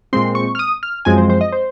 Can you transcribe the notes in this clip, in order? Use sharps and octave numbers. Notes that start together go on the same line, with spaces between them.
A#2 G#3 C4 C6
C#6
F6
D#6
F6
F#2 F3 G#3 C4 G#5
C5
C5
D#5
C5